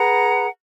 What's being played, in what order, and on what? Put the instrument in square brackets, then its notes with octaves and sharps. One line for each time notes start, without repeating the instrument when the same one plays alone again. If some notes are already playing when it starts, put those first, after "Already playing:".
Already playing: [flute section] G#4 B4 F#5 A#5